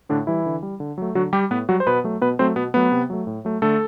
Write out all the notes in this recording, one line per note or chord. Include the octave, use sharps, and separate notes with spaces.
A2 D3 D4
E3 G3 E4
D3
G3
D3
F#3 A3
D3 F#3 F#4
G3 G4
A2 B3 B4
F#3 G3 F#4
C5
B2 B3 B4
F#3 A3
B2 B3 B4
F#3 A3 C4 C5
B2 B3 B4
F#3 A3 B3 B4
C3
F#3 A3
A2
F#3 A3
D3 A3 A4